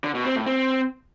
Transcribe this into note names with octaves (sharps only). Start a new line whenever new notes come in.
D3
B2
C4
A2
C4